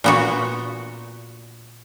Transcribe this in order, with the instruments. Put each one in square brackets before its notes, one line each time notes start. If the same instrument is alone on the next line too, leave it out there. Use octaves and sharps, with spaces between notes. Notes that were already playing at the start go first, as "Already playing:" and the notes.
[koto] A#2 B3 F#4